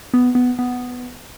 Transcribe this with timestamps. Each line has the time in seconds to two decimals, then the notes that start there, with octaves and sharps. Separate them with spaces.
0.14 B3
0.35 B3
0.59 B3